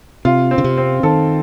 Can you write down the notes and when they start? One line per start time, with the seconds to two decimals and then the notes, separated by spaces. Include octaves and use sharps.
0.25 C3 F4
0.51 C4
0.58 C#3
0.64 C3
0.77 C4
1.03 D#3 A4